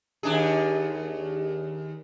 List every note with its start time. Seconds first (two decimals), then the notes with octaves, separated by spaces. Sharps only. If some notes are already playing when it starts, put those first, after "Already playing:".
0.23 D#2 D4 G#4